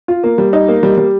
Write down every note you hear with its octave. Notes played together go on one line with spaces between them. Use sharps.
F4
A#3
G3
D#4
A#3
G3
G3